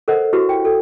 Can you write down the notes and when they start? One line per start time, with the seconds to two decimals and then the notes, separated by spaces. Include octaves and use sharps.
0.08 A4 A#4 C5 D#5 F#5
0.33 E4 F#4 G4 B4
0.49 G5
0.65 A4